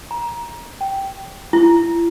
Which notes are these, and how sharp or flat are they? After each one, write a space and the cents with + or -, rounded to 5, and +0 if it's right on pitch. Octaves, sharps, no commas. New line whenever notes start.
A#5 +20
G5 -10
E4 +40